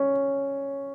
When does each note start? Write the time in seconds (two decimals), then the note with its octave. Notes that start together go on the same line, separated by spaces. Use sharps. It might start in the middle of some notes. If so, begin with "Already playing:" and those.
Already playing: C#4